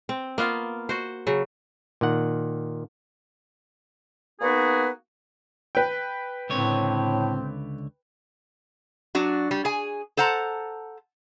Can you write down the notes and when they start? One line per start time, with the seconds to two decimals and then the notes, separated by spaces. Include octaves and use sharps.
0.09 C4
0.38 A#3 B3 F4
0.89 F#4 C5
1.27 C#3 F#3
2.01 A#2 D#3 F#5
4.41 A#3 B3 D#4 F#4 G#4 B4
5.75 B4 G5
6.50 C#2 A2 D3 C4 C#5
9.15 F#3 D4 F#4
9.51 G3
9.65 G#4 G#5
10.17 A4 C5 F#5 A5 A#5